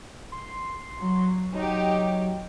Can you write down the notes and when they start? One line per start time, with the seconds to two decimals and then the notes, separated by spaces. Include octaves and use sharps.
0.32 C6
0.99 F#3
1.54 F#3 D#4 G4